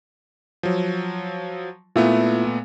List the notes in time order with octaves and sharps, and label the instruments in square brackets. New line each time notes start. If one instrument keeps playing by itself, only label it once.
[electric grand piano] F3 F#3
[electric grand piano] A#2 A3 B3 [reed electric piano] E4 F4 E5